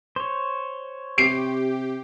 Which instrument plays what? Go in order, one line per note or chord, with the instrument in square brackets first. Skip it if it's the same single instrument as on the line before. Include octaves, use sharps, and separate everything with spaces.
[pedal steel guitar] C5 C#5
[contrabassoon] C3 [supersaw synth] G4 [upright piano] C7 D7